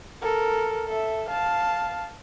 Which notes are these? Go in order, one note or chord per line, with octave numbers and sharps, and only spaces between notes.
A4 A#4
A4 E5
F5 A5